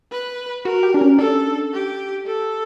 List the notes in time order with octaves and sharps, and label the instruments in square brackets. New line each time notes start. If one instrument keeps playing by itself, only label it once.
[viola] B4
[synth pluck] F#4 [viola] A#4
[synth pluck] G4
D4
C#4
[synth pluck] D4 [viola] A4
[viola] G4
A4